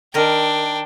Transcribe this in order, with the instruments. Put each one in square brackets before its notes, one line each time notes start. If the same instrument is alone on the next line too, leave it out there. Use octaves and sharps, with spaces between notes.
[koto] D#3 A#4 A#5 [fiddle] D4 G5